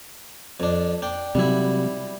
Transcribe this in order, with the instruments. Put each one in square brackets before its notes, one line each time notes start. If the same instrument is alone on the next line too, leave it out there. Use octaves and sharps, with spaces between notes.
[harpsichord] F2 D4
D4 G5
[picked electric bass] C3 F#3 [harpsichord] G3 E4